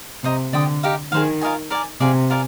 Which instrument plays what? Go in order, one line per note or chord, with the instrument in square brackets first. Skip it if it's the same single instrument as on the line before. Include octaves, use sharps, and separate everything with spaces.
[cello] C3 [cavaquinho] C5 D#5 A#5
[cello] D3 [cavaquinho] D5 G5 C6 D#6
[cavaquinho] D#4 G4 A#4 F5
[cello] D#3 [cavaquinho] G#4 C5 F5
[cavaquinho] F4 A#4 D#5 G#5
A#4 D5 G#5
[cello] C3 [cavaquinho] G#4 D5 F5 G#5
[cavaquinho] F4 A#4 D5 G#5